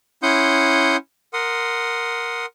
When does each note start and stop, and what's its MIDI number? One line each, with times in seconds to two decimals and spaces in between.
0.23 0.97 61
0.23 0.97 64
0.23 0.97 78
0.23 0.97 84
0.23 0.97 87
0.23 0.97 91
1.33 2.46 70
1.33 2.46 78
1.33 2.46 84
1.33 2.46 87